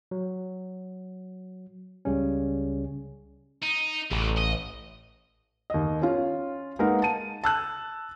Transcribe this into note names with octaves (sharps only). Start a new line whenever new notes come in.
F#3
C#2 C#3 G3 C#4
D#4
A1 E2 C#3
D#5
D#2 D#5
C#4 F4
G#3 A#3 D#4 A#4 B4 F#5
A5 D#7
A5 E6 F#6